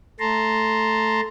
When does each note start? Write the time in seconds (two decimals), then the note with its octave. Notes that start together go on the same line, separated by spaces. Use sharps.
0.20 A3 A5 A#5 C6